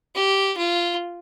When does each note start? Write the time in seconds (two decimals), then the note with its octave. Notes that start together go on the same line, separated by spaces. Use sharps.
0.15 G4
0.57 F4